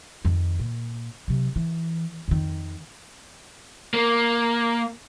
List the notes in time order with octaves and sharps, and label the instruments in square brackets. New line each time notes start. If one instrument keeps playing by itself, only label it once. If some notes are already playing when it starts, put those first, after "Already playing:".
[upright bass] F2 D#3
A#2
C3 F#3
E3
F2 D#3
[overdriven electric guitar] A#3